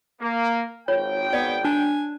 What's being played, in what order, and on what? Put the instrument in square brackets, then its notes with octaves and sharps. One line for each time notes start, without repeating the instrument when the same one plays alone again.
[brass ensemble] A#3
[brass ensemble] G#1 G5 [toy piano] F4 C#5
[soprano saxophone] B3 [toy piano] D5
[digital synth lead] D4 [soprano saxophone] G#5